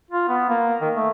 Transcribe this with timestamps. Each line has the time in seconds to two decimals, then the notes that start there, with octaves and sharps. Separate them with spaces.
0.11 F4
0.28 B3
0.49 A#3
0.81 D#3
0.95 A3